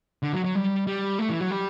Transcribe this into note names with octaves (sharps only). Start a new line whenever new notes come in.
D3
F#3
F#3
G3
G3
A3
E3
F#3
G3